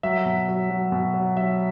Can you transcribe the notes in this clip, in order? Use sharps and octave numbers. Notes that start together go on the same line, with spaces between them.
F#3 E5
B2
F#3
F#3
B2
F#3
F#3 E5